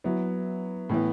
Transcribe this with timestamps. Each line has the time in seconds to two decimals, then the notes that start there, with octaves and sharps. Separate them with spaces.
0.04 F#3 B3 E4
0.89 A2 E3 B3